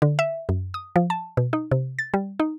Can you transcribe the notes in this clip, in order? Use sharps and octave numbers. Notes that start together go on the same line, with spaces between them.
D3
E5
F#2
D#6
F3
A5
B2
D#4
C3
A6
G3
D#4